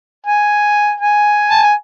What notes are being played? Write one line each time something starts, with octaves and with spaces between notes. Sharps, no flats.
G#5
G#5
A5
G#5